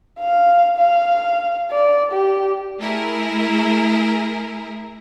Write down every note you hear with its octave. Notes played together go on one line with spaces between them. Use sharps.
F5
F5
D5
G4
A3 E4 G#4 A#4